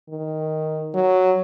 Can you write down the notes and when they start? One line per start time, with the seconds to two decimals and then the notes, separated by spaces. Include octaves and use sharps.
0.09 D#3
0.94 F#3